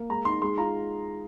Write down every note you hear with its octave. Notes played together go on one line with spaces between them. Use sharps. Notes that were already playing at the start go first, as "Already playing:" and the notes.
Already playing: A#3
G#3 A#5
D#4 C6
G#3 C6
F4 A#5